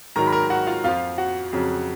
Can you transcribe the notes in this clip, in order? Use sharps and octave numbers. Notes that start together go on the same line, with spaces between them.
G#2 D#3 F#3 A#4 A#5
B5
A#4 A#5
F#4 F#5
F4 F5
F2 F3 F4 F5
F#4 F#5
F2 C#3 F#3